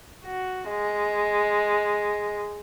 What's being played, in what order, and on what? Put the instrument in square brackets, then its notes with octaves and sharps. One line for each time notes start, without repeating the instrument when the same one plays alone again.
[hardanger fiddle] F#4
G#3